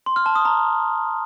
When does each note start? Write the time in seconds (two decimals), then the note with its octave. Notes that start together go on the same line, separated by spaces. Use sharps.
0.06 C6
0.16 F6
0.26 A5
0.35 D#6
0.45 A#5